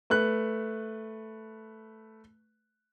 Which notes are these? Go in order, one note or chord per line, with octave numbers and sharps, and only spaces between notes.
A3 B4 F#6